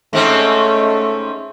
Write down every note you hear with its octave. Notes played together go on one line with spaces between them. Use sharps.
G#2 A3 C4 C#4